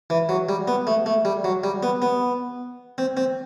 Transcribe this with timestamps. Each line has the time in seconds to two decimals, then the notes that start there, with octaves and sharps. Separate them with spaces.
0.10 E3
0.29 F#3
0.49 G3
0.68 B3
0.87 A3
1.06 A3
1.25 G3
1.44 F#3
1.64 G3
1.83 B3
2.02 B3
2.98 C4
3.17 C4